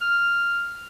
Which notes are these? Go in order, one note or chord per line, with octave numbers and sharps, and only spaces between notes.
F6